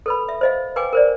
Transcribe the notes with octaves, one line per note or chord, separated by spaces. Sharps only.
A4 B4 B5
E5
C5 D#5 F5
B4 F5 G5 G#5 D6
A#4 C5 D5